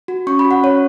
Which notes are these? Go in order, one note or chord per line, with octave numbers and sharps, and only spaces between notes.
F#4
C#4 C#6
B5
F#4
F#5
C#4 C#5